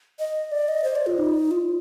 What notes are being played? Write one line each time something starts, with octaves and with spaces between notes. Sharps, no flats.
D#5
D5
D#5
C5
D5
F4
D#4
F4